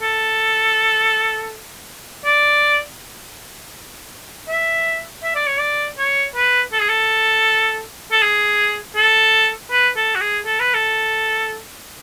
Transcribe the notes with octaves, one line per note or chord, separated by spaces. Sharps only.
A4
D5
E5
E5
D5
C#5
D5
C#5
B4
A4
G#4
A4
A4
G#4
A4
B4
A4
F#4
G#4
A4
B4
A4